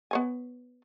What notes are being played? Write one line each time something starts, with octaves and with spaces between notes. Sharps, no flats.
B3 C#5 G#5